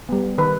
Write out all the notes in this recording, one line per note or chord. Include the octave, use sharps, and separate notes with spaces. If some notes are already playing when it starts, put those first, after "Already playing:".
G3 B3
D#3 B4